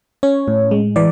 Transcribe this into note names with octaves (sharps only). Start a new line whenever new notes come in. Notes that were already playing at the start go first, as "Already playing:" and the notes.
C#4 C#5
A2
G#3
E3 D5